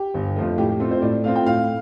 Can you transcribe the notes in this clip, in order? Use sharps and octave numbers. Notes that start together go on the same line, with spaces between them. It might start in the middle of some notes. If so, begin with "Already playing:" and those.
Already playing: G4
G1
F2 F3 A3
A2 G4
G4
A3 C4 F4 A4
C5
A2 D5
A3 C4 F4 F5
G5
A2 F5